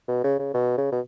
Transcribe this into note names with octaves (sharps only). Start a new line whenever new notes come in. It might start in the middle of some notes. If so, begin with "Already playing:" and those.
B2
C#3
C#3
B2
C#3
B2